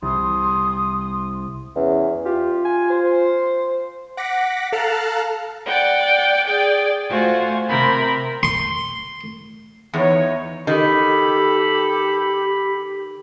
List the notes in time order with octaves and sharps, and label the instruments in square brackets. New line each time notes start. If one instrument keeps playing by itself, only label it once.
[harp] C2 [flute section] C6 D#6
[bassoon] E2 [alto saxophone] C#4
[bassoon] F4 [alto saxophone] G4
[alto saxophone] G#5
C5
[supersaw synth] F#5 D6 A#6 B6
A4 F5 A5 A#5 F6 F#6
[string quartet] D5 F#5 G5
G#4 D5 G5
A3 F4 F#4 C5 G#5
C3 C4 A#4 B5
[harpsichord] C6
[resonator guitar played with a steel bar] E2 [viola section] D#4 C#5
[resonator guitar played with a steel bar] D#3 [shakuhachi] G4 [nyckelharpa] A4 [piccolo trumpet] B5